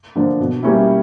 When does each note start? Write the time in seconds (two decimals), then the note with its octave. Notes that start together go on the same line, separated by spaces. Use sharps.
0.15 D3 F3 A#3 D4
0.40 B2
0.63 G3 A#3 C#4 E4